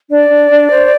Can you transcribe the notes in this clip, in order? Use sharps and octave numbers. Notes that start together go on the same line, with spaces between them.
D4 D5
D4
D4
C5